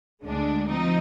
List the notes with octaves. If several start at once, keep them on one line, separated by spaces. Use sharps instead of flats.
D2 D3 G#3 D4
F3 C4 D#4